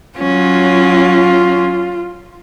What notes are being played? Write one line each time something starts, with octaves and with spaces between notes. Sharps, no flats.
F#3 C#4 F4